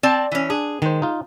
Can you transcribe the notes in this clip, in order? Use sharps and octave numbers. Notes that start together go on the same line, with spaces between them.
C4 D5 A5
E3 C#4
D4 G#4
D#3 G#3 C5
D#4 F4